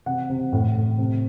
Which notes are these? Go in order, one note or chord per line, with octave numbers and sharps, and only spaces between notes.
C3 F#5
C3
A2
A2
C3